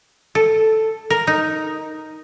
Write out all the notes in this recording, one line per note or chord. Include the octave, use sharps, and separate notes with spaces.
A4
A#4
D#4